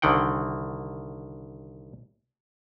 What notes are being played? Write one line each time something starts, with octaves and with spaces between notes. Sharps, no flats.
C2 D3 D#3 F#5 G5